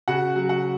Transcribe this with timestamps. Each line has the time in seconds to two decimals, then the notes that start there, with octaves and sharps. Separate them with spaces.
0.08 C#3 F#4 F#5
0.36 F#3
0.49 F#4 F#5